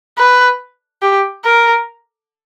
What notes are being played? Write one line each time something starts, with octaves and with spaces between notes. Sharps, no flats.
B4
G4
A#4